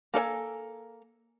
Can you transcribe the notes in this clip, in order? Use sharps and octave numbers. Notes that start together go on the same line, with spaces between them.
A#3 A4 D5 G#5